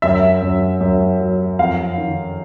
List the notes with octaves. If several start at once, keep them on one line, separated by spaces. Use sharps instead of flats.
F#2 E5
F#2
F#2
F#3
F2 F5
D#3